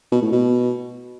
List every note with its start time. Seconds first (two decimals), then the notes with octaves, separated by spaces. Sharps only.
0.12 B2
0.22 A2
0.32 B2